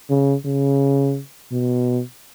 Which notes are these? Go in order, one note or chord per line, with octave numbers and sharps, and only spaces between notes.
C#3
C#3
B2